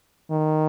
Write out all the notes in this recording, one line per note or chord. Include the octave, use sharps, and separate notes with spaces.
D#3